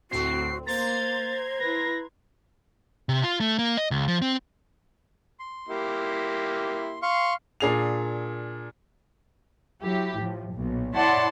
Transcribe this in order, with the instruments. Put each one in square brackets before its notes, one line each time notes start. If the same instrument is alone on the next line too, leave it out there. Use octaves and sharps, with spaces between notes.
[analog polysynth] D2 A2 C4 [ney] F#4 [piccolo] C7
[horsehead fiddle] A#3 [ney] C5 [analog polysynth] A#5 C6 G#6 [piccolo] A6
[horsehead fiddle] E4 B4 [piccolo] A#6
[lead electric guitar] C3
F4
A3
A#3
D#5
C#2
F3
C4
[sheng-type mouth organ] C6
[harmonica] A#3 E4 G4
[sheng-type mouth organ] F5 C6 C#6
[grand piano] A#2 D4 G#4 C7 F7
[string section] F#3 E4 G4
A2 F3
B1 A#2
E4 C#5 D5 F#5 A5 C6